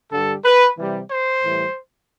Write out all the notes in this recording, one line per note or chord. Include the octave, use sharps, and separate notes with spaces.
G2 D3 G3 A4
B4
C3 E3 G3
C5
A2 E3 G3